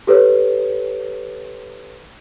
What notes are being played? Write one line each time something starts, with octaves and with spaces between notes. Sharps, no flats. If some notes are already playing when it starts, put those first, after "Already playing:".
G4 A4 B4 C#5